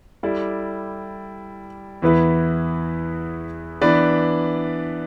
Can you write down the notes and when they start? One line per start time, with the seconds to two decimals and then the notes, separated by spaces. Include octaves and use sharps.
0.23 G3 E4 A4 D5
2.02 E2 E3 B3 E4 B4
3.81 E3 B3 D4 B4 D5